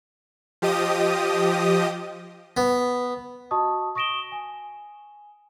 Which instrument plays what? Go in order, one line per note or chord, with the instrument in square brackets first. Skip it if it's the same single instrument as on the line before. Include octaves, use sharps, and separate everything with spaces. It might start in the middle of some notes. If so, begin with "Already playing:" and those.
[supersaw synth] F3 G4 D#5 D#6
[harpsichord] B3
[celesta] F#4 D#5 A5 C#6 D#6
C#6 D#6 A#6 D7 E7 G7
G#5